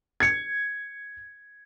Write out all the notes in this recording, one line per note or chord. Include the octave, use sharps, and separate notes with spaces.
G#6 C#7